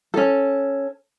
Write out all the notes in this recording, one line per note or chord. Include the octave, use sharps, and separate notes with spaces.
C#4 A4